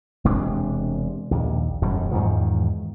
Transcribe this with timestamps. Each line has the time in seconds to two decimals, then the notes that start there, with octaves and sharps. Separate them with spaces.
0.25 E1 C3 G#3 D4
1.31 A#1 D#2
1.82 E1 F#2 A2 G3
2.11 E2 G#2 D#3 F3